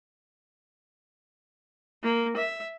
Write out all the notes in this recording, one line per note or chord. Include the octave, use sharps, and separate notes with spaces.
A#3
E5